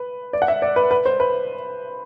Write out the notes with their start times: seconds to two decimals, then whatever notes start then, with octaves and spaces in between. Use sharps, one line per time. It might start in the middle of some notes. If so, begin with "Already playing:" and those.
Already playing: B4
0.33 D5
0.42 F#5
0.48 E5
0.62 D5
0.76 B4
0.91 B4
1.06 C5
1.20 B4